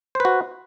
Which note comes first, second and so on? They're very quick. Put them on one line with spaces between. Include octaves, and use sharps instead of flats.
C5 B4 F#4